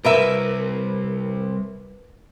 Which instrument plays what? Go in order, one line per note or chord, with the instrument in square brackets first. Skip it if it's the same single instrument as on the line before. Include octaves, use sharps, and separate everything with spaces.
[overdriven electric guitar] C2 G#2 [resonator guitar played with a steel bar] A#4 B4 E5